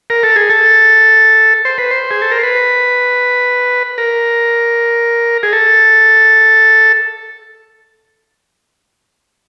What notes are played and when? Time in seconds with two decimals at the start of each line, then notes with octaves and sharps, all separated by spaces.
0.10 A#4
0.23 A4
0.36 G#4
0.50 A4
1.65 C5
1.78 B4
1.91 C5
2.11 G#4
2.22 A4
2.31 A#4
2.43 B4
3.98 A#4
5.43 G#4
5.53 A4